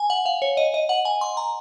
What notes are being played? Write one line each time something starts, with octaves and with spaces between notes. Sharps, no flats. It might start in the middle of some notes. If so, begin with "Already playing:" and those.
Already playing: G#5
F#5
F5
C#5
D#5
D#5
F#5
G#5
C6
A#5